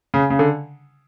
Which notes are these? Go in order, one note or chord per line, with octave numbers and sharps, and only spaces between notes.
C#3
C#3
D3